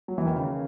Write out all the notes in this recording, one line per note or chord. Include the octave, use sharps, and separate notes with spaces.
F#3
E3
D#3
C#3